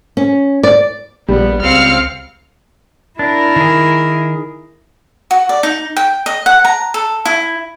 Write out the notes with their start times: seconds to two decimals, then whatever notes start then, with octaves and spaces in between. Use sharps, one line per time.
0.17 C#4
0.63 D5
1.28 A#1 G3 B3
1.62 C#2 C4 F5 F6 C#7
3.19 D4 E4 A#4
3.56 D#3 G#4
5.31 F#4
5.49 D5
5.63 D#4
5.96 G5
6.26 D#5
6.46 F#5
6.65 A#5
6.94 A4
7.25 E4